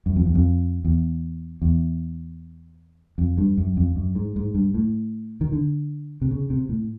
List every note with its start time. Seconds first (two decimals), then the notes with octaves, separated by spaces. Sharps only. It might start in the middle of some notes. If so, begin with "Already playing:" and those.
0.06 F#2
0.16 F2
0.25 E2
0.35 F2
0.85 E2
1.62 E2
3.18 F2
3.38 G2
3.57 F#2
3.77 F2
3.96 F#2
4.15 G#2
4.36 G#2
4.55 G2
4.74 A2
5.41 D#3
5.52 D3
6.22 C3
6.31 C#3
6.50 C3
6.69 A2